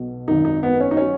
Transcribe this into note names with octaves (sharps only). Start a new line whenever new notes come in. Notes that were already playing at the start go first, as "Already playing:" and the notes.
Already playing: B1 B2
G#1 F#2 D#3 F#3 D#4
D#4
B3
C#4
D#4
F#3 C#4